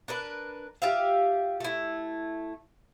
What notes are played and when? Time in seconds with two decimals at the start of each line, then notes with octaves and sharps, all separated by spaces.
0.08 D4 A#4 B4
0.82 F4 G4 E5 F5
1.60 A3 E4